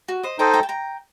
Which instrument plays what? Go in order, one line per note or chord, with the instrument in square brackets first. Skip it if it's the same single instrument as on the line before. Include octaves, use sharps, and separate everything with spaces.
[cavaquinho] F#4
C5 D#5
[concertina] D#4 A4 C5 D#5 [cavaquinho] G5 A#5
[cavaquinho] G5 A#5
A5
G5 A#5